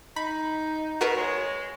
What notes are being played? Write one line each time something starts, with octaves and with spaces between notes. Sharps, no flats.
D#4 B5
B2 F#4 A#4 B4
G#3 C#5